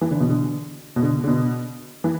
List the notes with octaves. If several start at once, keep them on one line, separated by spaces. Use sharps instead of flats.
E3
D3
B2
D3
B2
D3
D3
B2
E3